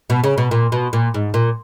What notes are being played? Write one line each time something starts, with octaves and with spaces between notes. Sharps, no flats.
B2
C#3
B2
A#2
B2
A#2
G#2
A#2